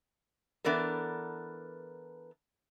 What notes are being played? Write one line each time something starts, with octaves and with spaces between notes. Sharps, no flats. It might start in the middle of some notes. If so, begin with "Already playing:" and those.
E3 B3 D4 A4 A#4